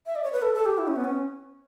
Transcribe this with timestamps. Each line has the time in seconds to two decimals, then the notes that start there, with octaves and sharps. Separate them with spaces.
0.06 E5
0.16 D5
0.24 C#5
0.33 B4
0.42 A4
0.54 A4
0.66 G4
0.78 E4
0.87 C#4
0.96 B3
1.04 C#4